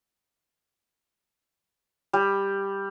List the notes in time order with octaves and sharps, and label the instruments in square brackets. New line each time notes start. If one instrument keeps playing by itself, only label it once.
[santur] G3